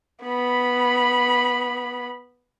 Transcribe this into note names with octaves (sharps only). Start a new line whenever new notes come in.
B3 B5